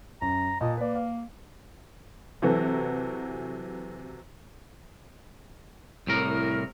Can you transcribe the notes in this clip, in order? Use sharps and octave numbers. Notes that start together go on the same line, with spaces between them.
F#2 A#5
A#2 D#5 A5 D#6
A#3 B4 D5
F5
C3 E3 F#3 F#4 A4
C2 A2 A#4